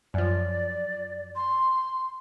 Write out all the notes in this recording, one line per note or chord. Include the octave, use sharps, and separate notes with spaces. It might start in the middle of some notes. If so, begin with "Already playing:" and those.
F#2 F3 D5
C6